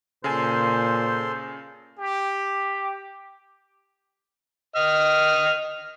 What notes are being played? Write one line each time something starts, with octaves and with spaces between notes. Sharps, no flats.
A#2 C#3 A4 C5 G#5 C6
G4
D#5 F6